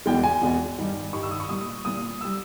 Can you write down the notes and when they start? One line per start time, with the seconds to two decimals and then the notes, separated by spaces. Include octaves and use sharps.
0.06 E2 B2 G#3 G5
0.24 G#5
0.41 E2 B2 G#3
0.78 G2 D#3 G3
1.13 G2 D#3 G3 C#6
1.23 E6
1.31 D#6
1.40 C#6
1.49 A#2 G3 D#6
1.84 A#2 G3 D#6
2.21 G3 E6